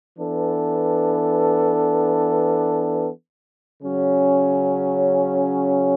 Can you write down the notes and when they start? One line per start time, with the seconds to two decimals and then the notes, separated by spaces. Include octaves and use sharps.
0.17 E3 B3 D4 A4
3.82 C#3 F#3 C#4